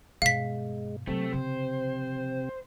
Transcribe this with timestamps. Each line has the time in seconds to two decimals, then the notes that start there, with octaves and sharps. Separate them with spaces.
0.22 G2 B2 G#3 F5 B6
1.07 C3 F#3 A3 A#3 C4
1.33 C#3 F3 C5